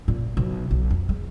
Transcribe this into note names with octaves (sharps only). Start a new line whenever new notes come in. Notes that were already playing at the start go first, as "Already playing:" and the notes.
A#2
B1
B1
F2
G#3